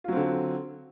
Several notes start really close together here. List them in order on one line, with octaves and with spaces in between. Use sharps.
F4 F#3 C4 D3